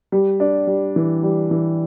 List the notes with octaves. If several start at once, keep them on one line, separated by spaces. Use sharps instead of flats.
G3
D4
G3
E3
G3
E3